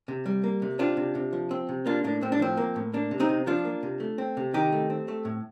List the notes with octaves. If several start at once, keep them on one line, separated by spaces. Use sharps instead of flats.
C3
G3
A#3
C3
C4 D4 F4
C3
C3
F3
C4
C3
A#3 D4 F4
A2 D4
A2 C4
D4
F3 C4
A#3
A2
A#3 D4
C3
C4 D#4
C3
F3 D4 F4
A#3
C3
A3
C4
C3
D#3 D#4 G4
A3
C4
A3
A2